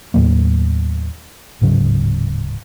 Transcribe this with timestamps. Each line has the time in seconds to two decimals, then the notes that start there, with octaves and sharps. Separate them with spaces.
0.14 D#2 A2 F#3 A#3
1.61 D1 G#2 C#3 F#3